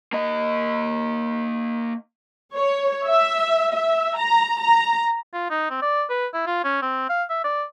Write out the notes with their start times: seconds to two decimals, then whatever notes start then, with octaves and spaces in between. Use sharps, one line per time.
0.13 A#3 D#5
2.54 C#5
3.07 E5
3.74 E5
4.18 A#5
4.61 A#5
5.34 F4
5.50 D#4
5.70 C4
5.82 D5
6.10 B4
6.33 E4
6.47 F4
6.64 C#4
6.82 C4
7.09 F5
7.29 E5
7.44 D5